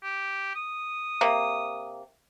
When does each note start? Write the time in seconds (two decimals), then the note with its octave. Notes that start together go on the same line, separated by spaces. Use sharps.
0.03 G4
0.55 D#6
1.21 C3 A#3